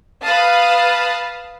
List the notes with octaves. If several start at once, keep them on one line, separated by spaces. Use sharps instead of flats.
B4 F5 A5 D#6